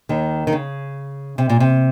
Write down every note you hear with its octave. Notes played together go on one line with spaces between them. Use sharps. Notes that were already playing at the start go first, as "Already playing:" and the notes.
D#2 D#3
D#3
C#3
C3
A#2
C3